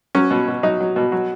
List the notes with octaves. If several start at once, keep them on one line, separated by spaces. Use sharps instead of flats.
F#3 C#4
B2
B2
F#3 D#4
F#3
B2
F#3